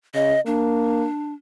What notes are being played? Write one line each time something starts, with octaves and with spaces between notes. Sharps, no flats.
C#3 D#5
A#3 D4